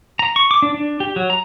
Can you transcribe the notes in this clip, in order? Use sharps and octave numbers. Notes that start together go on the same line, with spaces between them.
A#5
C#6
D6
D4
D4
G4
F#3
A#5